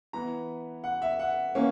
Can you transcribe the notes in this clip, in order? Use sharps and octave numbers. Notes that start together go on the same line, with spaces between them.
E3 B3 A#5
F#5
E5
F#5
E3 A#3 C#4